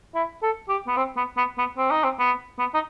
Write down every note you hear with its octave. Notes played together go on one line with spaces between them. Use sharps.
E4
A4
G4
B3
C4
B3
B3
B3
C4
D#4
C4
B3
B3
D#4